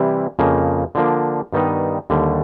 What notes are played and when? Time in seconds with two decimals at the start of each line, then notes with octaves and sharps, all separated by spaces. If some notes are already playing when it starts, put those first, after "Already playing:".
Already playing: C3 E3 G3 C4 E4
0.39 F2 C#3 F3 A#3
0.95 D3 F3 A#3 D4
1.53 G2 D#3 G3 B3 D#4
2.10 D#2 D3 G3